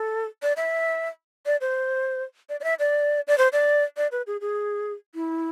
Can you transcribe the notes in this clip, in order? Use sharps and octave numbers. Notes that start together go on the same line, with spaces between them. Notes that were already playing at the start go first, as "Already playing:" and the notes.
Already playing: A4
D5
E5
D5
C5
D5
D5
E5
D5
D5
C5
D5
D5
B4
G#4
G#4
E4